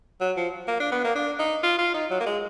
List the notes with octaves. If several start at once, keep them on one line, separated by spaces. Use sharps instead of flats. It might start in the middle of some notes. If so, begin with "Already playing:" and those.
F#3
F3
A#3
D4
B3
A#3
D4
D#4
F4
F4
D#4
F#3
A#3
G#3